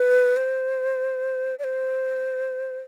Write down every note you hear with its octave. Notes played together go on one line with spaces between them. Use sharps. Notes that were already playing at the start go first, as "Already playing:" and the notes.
Already playing: B4
C5
D5
C5